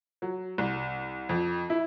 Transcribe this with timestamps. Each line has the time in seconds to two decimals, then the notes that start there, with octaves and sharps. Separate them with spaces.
0.22 F#3
0.58 C2
1.29 F2
1.70 E4